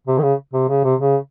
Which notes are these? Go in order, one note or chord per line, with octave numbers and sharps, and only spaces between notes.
C3
D#3
C#3
C3
C#3
C3
C#3